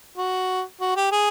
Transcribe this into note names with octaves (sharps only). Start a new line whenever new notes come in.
F#4
F#4
G4
G#4